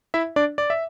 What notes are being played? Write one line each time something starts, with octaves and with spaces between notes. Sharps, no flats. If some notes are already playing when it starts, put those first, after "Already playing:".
E4 E5
D4 D5
D5
E5